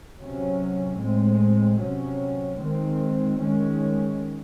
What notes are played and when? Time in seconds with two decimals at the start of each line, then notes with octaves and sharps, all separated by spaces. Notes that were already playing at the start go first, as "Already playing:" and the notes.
0.18 C3 F#3 C#4
0.98 A2 G#3 C4
1.78 C3 F#3 C#4
2.59 D#3 G#3 C4
3.39 D#3 G#3 C#4